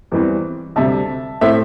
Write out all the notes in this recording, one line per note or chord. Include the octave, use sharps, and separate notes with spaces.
E2 E3 G3 C4
D2 C3 G3 E5 A5
A2 A3 C4 C5 E5